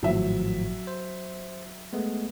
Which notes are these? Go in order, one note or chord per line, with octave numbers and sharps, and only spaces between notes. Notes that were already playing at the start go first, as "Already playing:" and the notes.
G#1 A2 F3 F#3 E5
C5
G#3 A3 B3